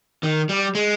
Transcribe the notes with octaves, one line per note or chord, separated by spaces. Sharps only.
D#3
G3
G#3